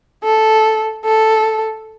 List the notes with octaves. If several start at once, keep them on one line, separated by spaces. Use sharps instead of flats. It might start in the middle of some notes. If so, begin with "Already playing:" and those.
A4
A4